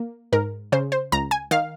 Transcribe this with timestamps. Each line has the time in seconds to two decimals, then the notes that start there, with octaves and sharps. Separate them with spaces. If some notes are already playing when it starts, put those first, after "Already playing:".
Already playing: A#3
0.32 G#2 A#4
0.72 C#3 C5
0.92 C5
1.12 C#2 A#5
1.31 G#5
1.51 D#3 F5